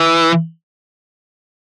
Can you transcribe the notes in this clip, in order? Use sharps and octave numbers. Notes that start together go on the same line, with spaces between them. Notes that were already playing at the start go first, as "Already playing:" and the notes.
Already playing: E3